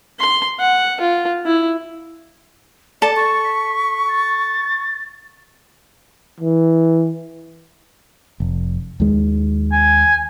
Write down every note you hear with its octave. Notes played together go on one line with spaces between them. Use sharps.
C6
F#5
F4
E4
A4 D5 A5 E7
C#6 A6
B6
A6
E3
F1
D#2 D#3 G#3
G#5